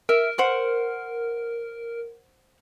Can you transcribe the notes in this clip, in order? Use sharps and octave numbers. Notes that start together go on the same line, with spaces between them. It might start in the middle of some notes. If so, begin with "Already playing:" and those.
A#4 E5
C5 F#5 C#6